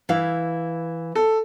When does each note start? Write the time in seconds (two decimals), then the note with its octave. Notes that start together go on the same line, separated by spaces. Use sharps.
0.09 E3 E4 F5
1.15 A4